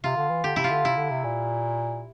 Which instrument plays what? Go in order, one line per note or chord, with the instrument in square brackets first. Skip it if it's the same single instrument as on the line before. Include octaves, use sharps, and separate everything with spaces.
[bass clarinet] C3 [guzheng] F4
[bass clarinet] D3
E3
[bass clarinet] D3 [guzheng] G4
[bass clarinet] C3 [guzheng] E4
[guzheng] F4
[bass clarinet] D3
[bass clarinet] C3 [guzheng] E4
[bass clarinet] D3
C3
A#2